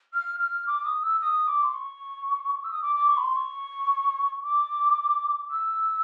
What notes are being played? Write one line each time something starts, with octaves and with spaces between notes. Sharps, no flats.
F6
F6
D6
D#6
E6
D#6
D6
C6
C#6
E6
D#6
D6
D6
C#6
B5
C6
C#6
D6
E6